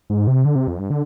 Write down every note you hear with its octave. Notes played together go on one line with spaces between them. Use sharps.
G#2
C3
D3
C3
F2
G2
D3